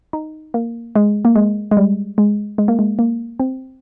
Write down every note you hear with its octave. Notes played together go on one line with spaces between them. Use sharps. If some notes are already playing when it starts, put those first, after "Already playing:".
D#4
A#3
G#3
A#3
G#3
G#3
G3
G#3
G#3
A#3
G#3
A#3
C4